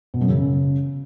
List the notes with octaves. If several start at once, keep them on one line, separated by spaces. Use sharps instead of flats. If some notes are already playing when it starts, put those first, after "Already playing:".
B2
F#2
C#3